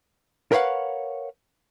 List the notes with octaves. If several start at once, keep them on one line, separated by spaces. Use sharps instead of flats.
A#4 B4 C#5 F5 F#5